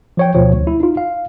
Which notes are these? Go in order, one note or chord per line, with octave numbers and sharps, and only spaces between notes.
F3 C#5 G5
D2 B2 F3 C#5
D2
E4
D#4 F4
F5